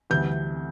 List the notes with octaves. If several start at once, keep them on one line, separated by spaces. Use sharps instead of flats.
D2 C3 E3 G3 G6